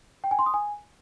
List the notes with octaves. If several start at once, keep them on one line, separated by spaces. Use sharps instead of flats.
G5
G#5
C6
D#6
G#5